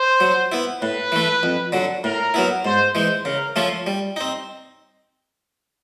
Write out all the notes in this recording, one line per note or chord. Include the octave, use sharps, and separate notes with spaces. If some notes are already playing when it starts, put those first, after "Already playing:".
Already playing: C5
F#3
B3 E4
A2 B4
E3 A3
F2
D3 F#3
A2 A#4
F#3 B3 E4
G#2 C5
E3 G#3 C5
C#3 A#4
F3 A3 C#4 F4
G3
C4 D#4